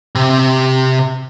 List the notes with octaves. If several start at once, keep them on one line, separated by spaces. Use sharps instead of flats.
C3 G4